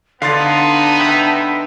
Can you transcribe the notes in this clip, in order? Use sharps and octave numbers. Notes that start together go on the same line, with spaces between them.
D3 B3 D4 D#4 A4 F5 C6 A6
B4 E5 G5